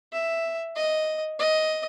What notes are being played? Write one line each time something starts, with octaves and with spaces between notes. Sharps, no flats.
E5
D#5
D#5